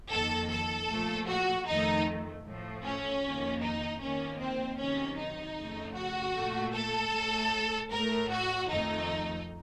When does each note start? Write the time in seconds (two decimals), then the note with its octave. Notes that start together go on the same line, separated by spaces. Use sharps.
0.10 F2 D#3 A#3 A4
0.49 A4
0.89 A#2 F3 A3
1.27 F#4
1.66 F2 D#3 A3 D#4
2.44 A2 F3 A3
2.83 C#4
3.22 F2 D#3 A#3
3.62 D#4
4.00 F2 D#3 A#3 C#4
4.40 C4
4.79 C3 D#3 F#3 C#4
5.18 D#4
5.57 F2 C#3 A3
5.96 F#4
6.35 A#2 A3
6.74 A4
7.13 A2 A3
7.91 A2 A3 A#4
8.30 F#4
8.69 F2 D#3 A3 D#4